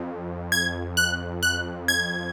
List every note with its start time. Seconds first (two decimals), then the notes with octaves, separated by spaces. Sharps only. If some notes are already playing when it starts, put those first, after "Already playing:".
Already playing: F2
0.52 G#6
0.97 F#6
1.43 F#6
1.88 G#6